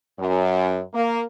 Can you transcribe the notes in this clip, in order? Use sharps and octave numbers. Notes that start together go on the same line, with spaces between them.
F#2
A#3